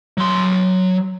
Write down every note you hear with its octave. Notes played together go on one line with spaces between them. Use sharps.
F#3 C6